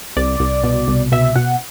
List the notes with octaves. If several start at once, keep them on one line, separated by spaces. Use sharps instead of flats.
C2 D5
C2
B2
C2
B2 E5
B2 F#5